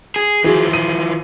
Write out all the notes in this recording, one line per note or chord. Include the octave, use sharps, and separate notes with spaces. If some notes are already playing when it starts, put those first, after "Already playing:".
G#4
E3 F3 F#4 G#4
D#7